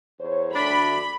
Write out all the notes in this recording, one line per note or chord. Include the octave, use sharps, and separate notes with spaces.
E2 C5 C#5
D2 D4 B5